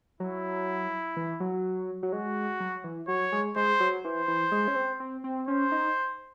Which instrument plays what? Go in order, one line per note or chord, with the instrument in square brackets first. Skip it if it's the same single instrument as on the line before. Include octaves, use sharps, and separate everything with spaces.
[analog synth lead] F#3 [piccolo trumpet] E4
[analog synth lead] E3
F#3
F#3
[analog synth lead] G#3 [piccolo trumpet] F#4
[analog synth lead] F#3
E3
[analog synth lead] F#3 [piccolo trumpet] C#5
[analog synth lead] G#3
[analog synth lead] G#3 [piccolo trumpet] C5
[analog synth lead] F#3
[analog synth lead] E3 [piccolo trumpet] C5
[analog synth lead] E3
G#3
C#4
C4
C4
C4
[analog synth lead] C#4 [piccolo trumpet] C5
[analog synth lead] D#4